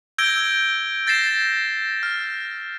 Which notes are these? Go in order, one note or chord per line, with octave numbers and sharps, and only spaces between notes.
E6 G6 G#6 A#6 D7 G7
G6 A6 A#6 C7 E7
F6